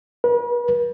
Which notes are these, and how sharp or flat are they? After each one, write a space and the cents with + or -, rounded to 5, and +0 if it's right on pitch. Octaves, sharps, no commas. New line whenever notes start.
B4 -45